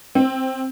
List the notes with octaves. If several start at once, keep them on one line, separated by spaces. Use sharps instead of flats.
C4